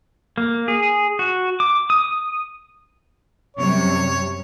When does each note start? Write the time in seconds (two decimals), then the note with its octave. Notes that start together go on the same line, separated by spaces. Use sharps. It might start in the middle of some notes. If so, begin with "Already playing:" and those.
0.38 A#3
0.68 G#4
1.19 F#4
1.60 D6
1.90 D#6
3.57 F#2 C3 G3 C#5